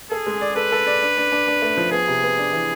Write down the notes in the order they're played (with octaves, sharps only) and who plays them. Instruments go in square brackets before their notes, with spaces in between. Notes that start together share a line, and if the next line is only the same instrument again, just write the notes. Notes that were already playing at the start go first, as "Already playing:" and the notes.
[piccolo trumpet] G#4 [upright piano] A4
[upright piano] G#3
D5
[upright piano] A4 [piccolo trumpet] B4
[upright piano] A4
D5
D4
D4
D4
D4
A3
F3
[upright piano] B3 [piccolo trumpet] G#4
[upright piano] C3
B3
D4
E3